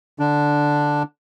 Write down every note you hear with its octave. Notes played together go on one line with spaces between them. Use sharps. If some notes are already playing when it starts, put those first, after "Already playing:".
D3 D4